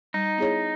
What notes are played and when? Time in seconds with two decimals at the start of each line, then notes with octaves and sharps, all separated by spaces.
0.14 G3 D#4
0.38 B3 E4 G#4 C#5